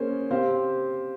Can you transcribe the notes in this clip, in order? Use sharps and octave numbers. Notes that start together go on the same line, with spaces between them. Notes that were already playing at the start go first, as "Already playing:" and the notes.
Already playing: A#3 C#4 G#4 C5
C4 G4 C5 F5